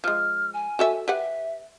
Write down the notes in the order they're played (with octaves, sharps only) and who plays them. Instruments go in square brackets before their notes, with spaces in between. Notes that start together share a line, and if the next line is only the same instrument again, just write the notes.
[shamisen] F3 G#3 [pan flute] F6
[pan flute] G#5
[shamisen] F#4 A4 E5
[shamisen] G4 B4 F#5 [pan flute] E5